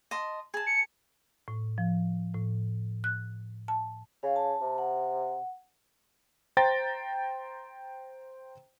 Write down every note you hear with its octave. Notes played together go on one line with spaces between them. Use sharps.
D#5 A5 C6
G#4 A5
C#7
A2
F3
A2
F#6
A5
C#3 F5
A5
C3
F#5
C5 G5 A#5 A6 A#6